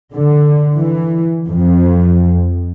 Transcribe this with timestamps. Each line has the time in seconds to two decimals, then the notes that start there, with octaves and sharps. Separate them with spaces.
0.14 D3
0.76 E3
1.48 F2